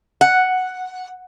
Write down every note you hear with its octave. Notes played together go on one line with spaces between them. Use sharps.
F#5